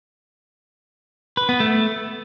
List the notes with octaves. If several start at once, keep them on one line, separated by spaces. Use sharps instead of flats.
B4
B3
A3